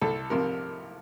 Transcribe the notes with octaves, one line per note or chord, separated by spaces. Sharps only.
C2 A4
C3 F3 A#4